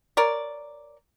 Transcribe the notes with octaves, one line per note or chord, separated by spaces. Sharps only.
A#4 C#5 D5